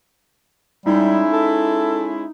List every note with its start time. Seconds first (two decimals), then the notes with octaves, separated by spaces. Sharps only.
0.86 G3 G#3 C#4 D#4 E4
1.33 A4